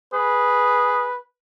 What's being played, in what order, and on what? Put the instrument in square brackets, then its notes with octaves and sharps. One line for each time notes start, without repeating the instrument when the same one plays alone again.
[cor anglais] G#4 [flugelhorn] B4